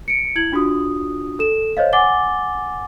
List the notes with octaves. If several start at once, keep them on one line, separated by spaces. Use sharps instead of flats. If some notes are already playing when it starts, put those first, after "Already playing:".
C#7 D7
E4 G#6 F#7
D4 F4 F#4 D#6
A4 E7
C5 C#5 D#5 F5
F#5 G#5 D6 A6 G7